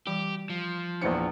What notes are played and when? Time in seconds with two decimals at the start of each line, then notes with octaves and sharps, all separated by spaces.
0.07 E3 G3 G4 B5
0.50 F3
1.02 A#1 E2 D4 E4 C5 C#7